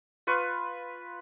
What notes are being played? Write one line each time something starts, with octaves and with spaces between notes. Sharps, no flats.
F4 B4 C#6